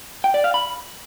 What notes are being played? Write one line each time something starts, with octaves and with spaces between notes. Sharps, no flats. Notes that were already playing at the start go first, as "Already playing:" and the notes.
G5
D5
F5
B5